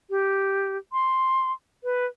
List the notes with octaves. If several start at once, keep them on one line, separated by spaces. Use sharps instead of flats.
G4
C6
B4